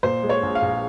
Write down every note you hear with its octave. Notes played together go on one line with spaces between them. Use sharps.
A#2 C5
G#3
C#5
A#1
F5
A#1